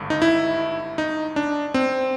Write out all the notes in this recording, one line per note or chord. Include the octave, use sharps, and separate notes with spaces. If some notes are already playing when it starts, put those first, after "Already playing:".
Already playing: G#1 G2 D3
D#4
E4
D#4
D4
C4